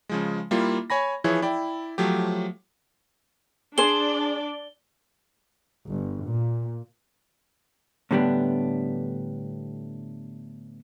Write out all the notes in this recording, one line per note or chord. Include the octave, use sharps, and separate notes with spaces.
C#3 F3 G#3
G3 A#3 E4 F4
C#5 G#5 B5 A#6
E3 F3 E4 G#4 C#5
E4 D5 G5
F3 F#3 A3 G4
D4 G#4 C5 D5 G7
G1
A#2
A2 D3 G3 B3 D4